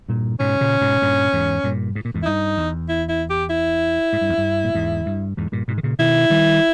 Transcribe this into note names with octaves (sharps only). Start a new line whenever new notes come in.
G2 A#2
G#2 B2 C#4
A#2 C#3
G#2 B2
G2 A#2
E2 G#2
G2 A#2
G#2
A#2
E2 G#2
E4
G2 D#4
E2
E4
E4
G4
E4
G#2
G2
E2
G2
A#2
E2 G#2
G2
E2 G#2
G2 A#2
G#2 B2
D#3
A#2 C#3
B2 D#3 E4
D#3 G3